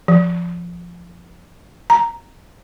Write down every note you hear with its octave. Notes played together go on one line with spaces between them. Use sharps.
F3
A#5